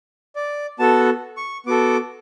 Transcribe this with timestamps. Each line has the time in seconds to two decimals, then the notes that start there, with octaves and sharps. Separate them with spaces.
0.36 D5
0.79 B3 F#4 A4 A5
1.37 C#6
1.66 B3 F#4 A4 D6